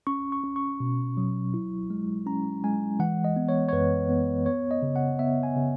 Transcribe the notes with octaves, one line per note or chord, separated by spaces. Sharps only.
C#4 C#6
C#6
C#4
C#6
B2
F#3
E4
G#3
C#4 A#5
G#3 G#5
E3 F#5
D#5
B3
C#5
C#5
F#2 B4
B3
B3 C#5
D#5
C#3
F#5
B3 E5
G#5
C#3